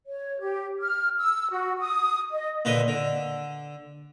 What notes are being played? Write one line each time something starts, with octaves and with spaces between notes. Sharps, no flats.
C#5
G4
F6
E6
F#4
D#6
D#5
A#2 D3 B4 D#5
D3